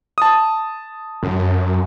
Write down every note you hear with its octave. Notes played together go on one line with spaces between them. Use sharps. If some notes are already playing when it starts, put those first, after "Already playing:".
A5 D#6
F#2